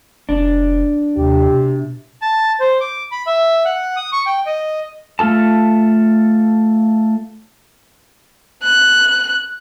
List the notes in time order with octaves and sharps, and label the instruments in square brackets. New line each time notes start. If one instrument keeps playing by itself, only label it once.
[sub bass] F1 [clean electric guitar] D4
[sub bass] D#2 [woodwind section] C3 [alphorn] G4
[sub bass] B2
[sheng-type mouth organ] A5
C5
D6
B5
E5
F#5
D#6
C#6
G5
D#5
[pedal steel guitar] A3 F4 A4 A5
[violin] F#6